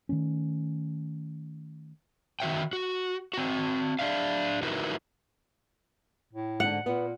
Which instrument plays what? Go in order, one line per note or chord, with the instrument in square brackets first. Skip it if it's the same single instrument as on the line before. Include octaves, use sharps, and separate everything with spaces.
[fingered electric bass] D#3 E3 A3 C#4
[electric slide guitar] D#3 F#4 E5 G5
F#4
C4 F#4
D4 E5 F5
D#4 E4 F#4 A#4 B4
[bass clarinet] A2
[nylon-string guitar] G#2 D3 [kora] F#5
[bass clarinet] A#2 [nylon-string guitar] B3